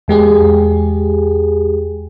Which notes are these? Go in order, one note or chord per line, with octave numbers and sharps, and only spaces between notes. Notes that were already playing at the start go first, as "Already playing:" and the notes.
E2 G#3 G4 G#4